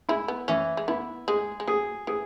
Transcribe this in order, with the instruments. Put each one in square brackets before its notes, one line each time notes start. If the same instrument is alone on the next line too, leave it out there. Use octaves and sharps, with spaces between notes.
[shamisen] G#3 [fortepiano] E4
[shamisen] B3
[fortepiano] E3 [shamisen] C#4
[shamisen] G#3
[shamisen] B3 [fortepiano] E4
[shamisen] G#3 [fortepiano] G#4
[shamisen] G#3
[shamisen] F#3 [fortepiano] G#4
[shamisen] E3 [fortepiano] G#4